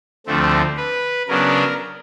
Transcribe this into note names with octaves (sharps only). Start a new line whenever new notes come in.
D2 D3 F3 A3 C4
B4
C#3 F#3 B3 D4 A#4